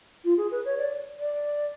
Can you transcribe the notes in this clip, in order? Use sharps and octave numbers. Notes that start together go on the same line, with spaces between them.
F4
G#4
B4
C#5
D5
D5